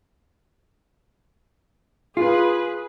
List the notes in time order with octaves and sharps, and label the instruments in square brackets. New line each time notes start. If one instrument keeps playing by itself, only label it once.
[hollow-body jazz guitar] F4 [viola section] G#4 B4